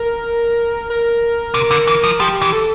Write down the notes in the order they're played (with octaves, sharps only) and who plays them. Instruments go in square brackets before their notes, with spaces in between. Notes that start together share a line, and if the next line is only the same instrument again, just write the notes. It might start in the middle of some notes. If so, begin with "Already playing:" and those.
Already playing: [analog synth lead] A#4
A#4
[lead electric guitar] C3
D3
E3
F3
[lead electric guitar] F3 [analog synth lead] G4
[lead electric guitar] E3
[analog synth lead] A4